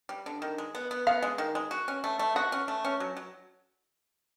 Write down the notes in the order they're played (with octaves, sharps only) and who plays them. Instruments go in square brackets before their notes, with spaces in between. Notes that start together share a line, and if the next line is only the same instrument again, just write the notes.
[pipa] G3
D3
D#3
G#3
B3
B3
[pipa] B3 [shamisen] F5
[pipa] G#3
D#3
G#3
F#4
C#4
A3
A3
[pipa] F#4 [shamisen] F#5
[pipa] C#4
A3
C#4
F#3
F#3